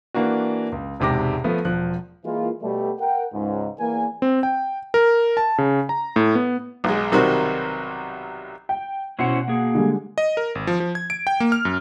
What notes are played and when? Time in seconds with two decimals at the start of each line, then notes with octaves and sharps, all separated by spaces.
0.14 E3 A#3 D4 F#4
0.72 C#2
1.00 E1 G#2 C3 G4 D6 A#6
1.44 F3 A3 B3
1.65 E1 F3 F#6
2.25 E3 G#3 A#3 F4
2.62 B2 G3 A3
2.99 A#4 F#5 G5
3.33 C#2 G#2
3.79 E2 A#3 A#4 G#5
4.22 C4
4.43 G5
4.94 A#4
5.37 A5
5.58 C#3
5.89 A#5
6.16 A2
6.35 B3
6.84 B1 G#3
7.12 B1 C3 D#3 G3 F#4 C5
8.69 G5
9.19 B2 C#4 E4 C5 F#5 C#7
9.48 A#3 G#4
9.75 D3 G3 G#3
10.18 D#5
10.37 A#4
10.55 G#1
10.67 F3
10.80 F3
10.95 G#6
11.10 D7
11.27 G5
11.40 A#3
11.52 F6
11.65 F#2